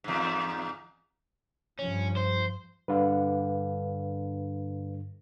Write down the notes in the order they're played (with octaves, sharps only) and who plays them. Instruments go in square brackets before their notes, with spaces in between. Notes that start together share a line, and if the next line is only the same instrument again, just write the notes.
[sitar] E2 G#2
[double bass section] G2 F3 [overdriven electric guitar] C#4
[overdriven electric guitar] C5
[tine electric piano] G2 D3 [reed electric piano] B4 F5